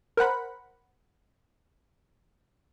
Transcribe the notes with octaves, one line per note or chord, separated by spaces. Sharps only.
A#4 C5 F#5 B5